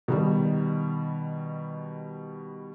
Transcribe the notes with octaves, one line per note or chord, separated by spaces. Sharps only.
B2 D#3 G3